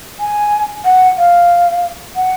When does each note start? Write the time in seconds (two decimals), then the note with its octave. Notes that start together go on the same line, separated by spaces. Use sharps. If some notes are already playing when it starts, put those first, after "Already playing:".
0.20 G#5
0.85 F#5
1.18 F5
2.16 F#5